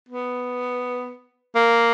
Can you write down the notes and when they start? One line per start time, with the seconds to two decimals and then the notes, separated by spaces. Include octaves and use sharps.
0.09 B3
1.55 A#3